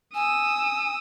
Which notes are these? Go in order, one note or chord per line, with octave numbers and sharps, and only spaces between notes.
G#5 D#6 E6